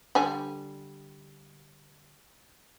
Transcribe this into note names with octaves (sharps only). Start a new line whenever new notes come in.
D3 G3 G#5